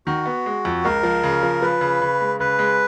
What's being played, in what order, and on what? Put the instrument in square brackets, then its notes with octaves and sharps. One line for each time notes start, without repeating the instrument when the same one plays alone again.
[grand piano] D#3 [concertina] F#4
[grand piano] B3
G#3
F2
[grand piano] C#2 [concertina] A#4
[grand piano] F3
C#3
F3
[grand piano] F3 [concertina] B4
[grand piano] C#3
C#3
G#3
[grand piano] C#3 [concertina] B4
[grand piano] G#3